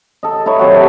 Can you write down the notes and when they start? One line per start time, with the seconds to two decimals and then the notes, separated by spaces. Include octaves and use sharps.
0.23 A4 D#5
0.46 D#4 E4 A4 C#5
0.59 C3 F#3 F#4
0.72 A4 C#5 E5 G5